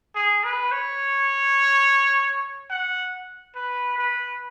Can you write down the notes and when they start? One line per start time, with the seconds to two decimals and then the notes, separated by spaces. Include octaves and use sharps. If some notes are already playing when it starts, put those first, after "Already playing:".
0.15 G#4
0.44 B4
0.72 C#5
2.70 F#5
3.55 B4
3.98 B4